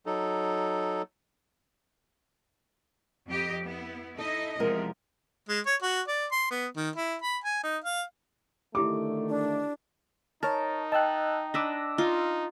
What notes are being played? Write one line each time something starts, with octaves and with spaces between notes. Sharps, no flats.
F#3 D#4 A4
F2 G4 D#5
B3 E4
D#4 E4 A4 D#5
E2 C3 F3 G#3 A#4
G#3
C#5
F#4
D5
C6
B3
D#3
E4
B5
G#5
D#4
F5
D3 D#3 A3 E4 G4 A4 D6
D4
D#4 A#4 C#5 A5
D#5 G5 A5 E6 F#6
D4 B4 D6 E6 A#6
D#4 F4